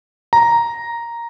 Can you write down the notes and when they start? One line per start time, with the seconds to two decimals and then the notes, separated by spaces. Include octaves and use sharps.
0.33 A#5